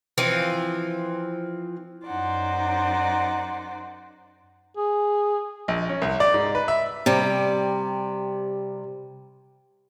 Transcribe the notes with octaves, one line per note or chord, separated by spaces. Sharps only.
E3 F3 C4
F#2 D#4 C5 D5 F#5
G#4
A#1
C#4
C2
D5
G#2
B4
E5
C3 G3